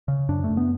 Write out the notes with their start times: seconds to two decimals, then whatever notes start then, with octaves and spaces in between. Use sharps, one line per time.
0.08 C#3
0.29 F#2 D4
0.44 A3
0.50 F#2
0.57 B3